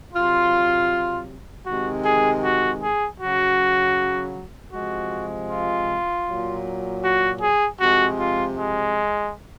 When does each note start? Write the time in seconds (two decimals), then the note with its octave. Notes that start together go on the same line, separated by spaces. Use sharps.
0.13 C3 F#3 F4
1.66 C3 D#3 G#3 F#4
2.05 G#4
2.44 F#4
2.82 G#4
3.20 C#3 F#3 F#4
4.73 C3 F3 G#3 F#4
5.50 F4
6.27 A#2 F#3
7.03 F#4
7.42 G#4
7.80 C3 F3 G#3 F#4
8.19 F4
8.57 G#3